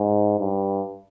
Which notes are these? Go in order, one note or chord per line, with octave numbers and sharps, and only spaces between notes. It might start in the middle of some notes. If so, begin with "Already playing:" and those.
Already playing: G#2
G2